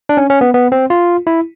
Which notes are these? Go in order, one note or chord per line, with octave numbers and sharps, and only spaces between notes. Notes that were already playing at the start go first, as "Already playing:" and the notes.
D4
C#4
C#4
B3
B3
C4
F4
E4